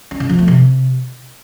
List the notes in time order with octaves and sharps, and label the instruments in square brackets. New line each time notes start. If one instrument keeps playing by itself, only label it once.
[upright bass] C#4
C#3
F3
A3
C3